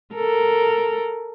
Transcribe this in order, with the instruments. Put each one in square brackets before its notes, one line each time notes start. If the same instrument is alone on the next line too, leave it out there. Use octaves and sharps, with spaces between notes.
[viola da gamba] A4 A#4